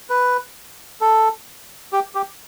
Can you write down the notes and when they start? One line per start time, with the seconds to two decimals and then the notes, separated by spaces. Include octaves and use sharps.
0.10 B4
1.01 A4
1.93 G4
2.15 G4